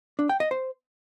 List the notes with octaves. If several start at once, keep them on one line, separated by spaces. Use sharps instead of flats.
D4
G5
D#5
C5